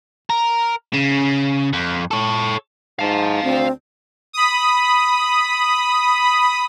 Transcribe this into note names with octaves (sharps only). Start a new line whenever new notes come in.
A#4
C#3
F2
A4 C#5
G#2 F5 A5
D2 C4
B5 D#6